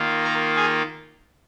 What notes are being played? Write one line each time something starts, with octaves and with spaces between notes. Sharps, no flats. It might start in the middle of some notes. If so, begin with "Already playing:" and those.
Already playing: D#3 A#3 F4
A#4 A#5
G#4 G#5